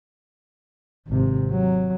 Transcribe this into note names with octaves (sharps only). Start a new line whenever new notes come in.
G#1 C3
F#3